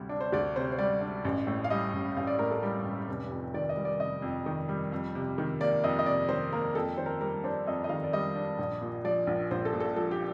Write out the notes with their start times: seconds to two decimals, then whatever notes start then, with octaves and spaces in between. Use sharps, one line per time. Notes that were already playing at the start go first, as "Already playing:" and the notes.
Already playing: D2 C3 G3
0.09 D4
0.21 C5
0.32 D2 D5
0.56 C3 C5
0.72 C5
0.79 G3 D5
1.01 D4
1.25 A1
1.47 A2
1.64 F5
1.70 G3 D#5
1.93 A1
2.16 A1 F5
2.27 D5
2.39 A2 A#4
2.51 A4
2.63 G3 G4
2.85 A1
3.08 F1
3.31 F2
3.54 D#3 D5
3.69 D#5
3.76 G3
3.85 D5
4.00 F1 D#5
4.22 F2
4.46 D#3
4.69 G3
4.92 F2
5.15 C3
5.38 D#3
5.60 A#3 D5
5.84 F2 D#5
5.99 D#5
6.06 C3 D5
6.29 D#3 C5
6.53 A#3 A#4
6.75 F2 A4
6.97 D#3 C5
7.06 A#4
7.21 G3 A#4
7.44 D4 C5
7.67 F2 D#5
7.84 D#5
7.89 D#3 F5
8.04 D5
8.13 G3 D#5
8.36 D4
8.59 A#1
8.81 A#2
9.05 F3 D5
9.27 A#1
9.51 A#1 C5
9.65 A4
9.73 A#2
9.80 A4
9.96 F3 A4
10.11 G4